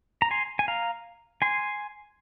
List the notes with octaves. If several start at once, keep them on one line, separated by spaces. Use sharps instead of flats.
A#5
G#5 C6
G#5
F5 A#5
G#5 C6